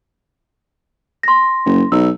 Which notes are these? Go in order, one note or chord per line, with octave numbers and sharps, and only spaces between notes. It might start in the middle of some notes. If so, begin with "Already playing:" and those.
C6 A#6
F#1
B1 E6